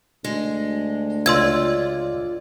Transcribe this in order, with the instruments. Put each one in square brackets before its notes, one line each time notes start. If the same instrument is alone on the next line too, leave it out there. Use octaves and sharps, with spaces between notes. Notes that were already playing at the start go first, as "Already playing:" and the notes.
[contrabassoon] D2 [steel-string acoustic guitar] G#3
[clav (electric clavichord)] C#2 [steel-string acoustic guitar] F4 D5 [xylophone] C6 E6 G#6